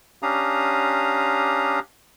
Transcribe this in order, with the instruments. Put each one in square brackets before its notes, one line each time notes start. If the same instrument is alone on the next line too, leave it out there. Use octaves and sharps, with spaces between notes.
[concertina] C#4 D4 G4 F5 A#5 D#6